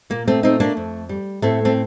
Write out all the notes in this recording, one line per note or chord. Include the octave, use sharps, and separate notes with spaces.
A#2 A#3
A3 C4
A3 C4 D#4
A#3 D4
F2
G3
A2 A3 C4
A3 C4